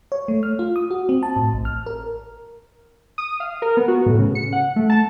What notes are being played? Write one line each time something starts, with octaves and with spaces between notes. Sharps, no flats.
C#5
A3
F6
F4
D#6
F#4
C4
A5
A2
A1
F6
A#4
D#6
F5
A#4
B3
F#4
A2
C#3
C#7
F#5
A3
A5